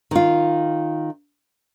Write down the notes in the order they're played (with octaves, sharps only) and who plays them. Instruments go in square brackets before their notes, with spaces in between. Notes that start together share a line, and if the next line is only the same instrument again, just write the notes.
[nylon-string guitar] D#3 F4